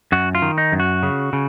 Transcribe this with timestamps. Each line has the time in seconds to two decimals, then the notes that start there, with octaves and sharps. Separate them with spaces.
0.12 F#2 F#4
0.35 F4
0.42 D#3
0.58 D#4
0.72 F#2
0.80 F#4
1.03 C#3
1.33 C#3